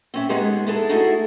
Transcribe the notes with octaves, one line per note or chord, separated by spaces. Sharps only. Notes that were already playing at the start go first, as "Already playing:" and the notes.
C4 C#4 E5
G#3 B3 D#4 G4 G#4
E4 G#4 A4
A3 D#4 E4 F#4 G#4 A4